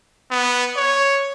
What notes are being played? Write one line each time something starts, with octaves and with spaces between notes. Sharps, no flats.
B3
C#5